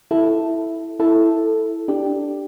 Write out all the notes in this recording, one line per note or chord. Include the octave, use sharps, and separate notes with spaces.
E4 A4
E4 A4
D4 G4